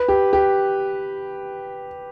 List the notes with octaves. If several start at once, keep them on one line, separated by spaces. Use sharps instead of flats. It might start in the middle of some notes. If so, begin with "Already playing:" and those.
Already playing: B4
G4
G4